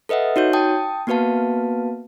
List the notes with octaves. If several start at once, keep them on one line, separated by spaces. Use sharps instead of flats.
A4 B4 D#5 E5 F#5
D#4 F#4 C#5 G6
G5 A5 D#6
A#3 B3 F#4 B4 F5 A5